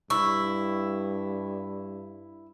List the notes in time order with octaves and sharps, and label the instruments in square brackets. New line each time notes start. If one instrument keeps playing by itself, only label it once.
[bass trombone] G2 [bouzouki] E4 [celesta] C#6